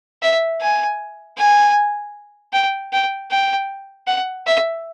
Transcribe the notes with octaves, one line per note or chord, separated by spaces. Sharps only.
E5
G#5
G#5
G5
G5
G5
F#5
E5